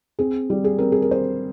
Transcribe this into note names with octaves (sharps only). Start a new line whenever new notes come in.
C4 G#4
G3
G#4
C4 A#4
G#4
A#4
C4 C5